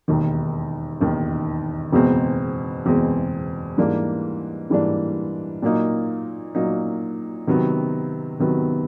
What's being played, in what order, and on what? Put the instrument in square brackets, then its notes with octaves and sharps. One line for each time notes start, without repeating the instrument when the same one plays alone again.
[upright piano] E1 D#2 D#3
E1 D#2 D#3
F#1 E2 B2 G#3 C4
F#1 E2 B2 G#3 C4
G#2 E3 G3 A#3 D4
G#2 E3 G3 A#3 D4
A#2 F#3 A#3 D#4
A#2 F#3 A#3 D#4
C3 D#3 F#3 B3
C3 D#3 F#3 B3